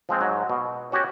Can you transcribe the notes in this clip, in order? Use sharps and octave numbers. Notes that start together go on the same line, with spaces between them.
F3 G#3 C4
G#2 F#3
B2
C#4 F#4 G4 C#5